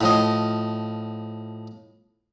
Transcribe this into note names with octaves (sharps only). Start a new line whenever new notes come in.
A2 F3 D#5